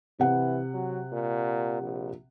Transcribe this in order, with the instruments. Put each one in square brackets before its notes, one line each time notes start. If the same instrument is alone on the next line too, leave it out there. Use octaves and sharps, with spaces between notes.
[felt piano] C3 F#5 [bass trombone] E3
[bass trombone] F#3
A#2
A#1